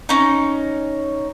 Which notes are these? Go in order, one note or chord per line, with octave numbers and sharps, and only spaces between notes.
C#4 D#4